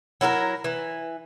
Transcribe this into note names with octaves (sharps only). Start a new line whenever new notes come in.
F#3 E4 A4 A#4
E3